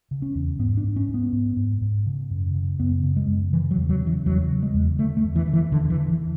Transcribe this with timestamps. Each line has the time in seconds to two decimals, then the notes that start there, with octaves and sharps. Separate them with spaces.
0.11 C#3
0.22 C#4
0.35 E2
0.59 G#2 B3
0.77 D4
0.84 G#2
0.96 C#4
1.09 G#2
1.14 B3
1.32 G#2
1.57 G#2
1.81 G#2
2.06 C#3
2.30 F#2
2.54 C#3
2.80 F#2 B3
3.03 C#3
3.16 G#3
3.27 F#2
3.53 C#3 E3
3.71 F#3
3.77 E2
3.89 F#3
4.02 C#3 E3
4.26 E2 F#3
4.51 C#3
4.63 G#3
4.74 E2
4.99 D3 A3
5.17 A3
5.24 E2
5.36 E3
5.48 D3
5.53 E3
5.72 E2 D3
5.90 E3
5.96 D3
6.10 E3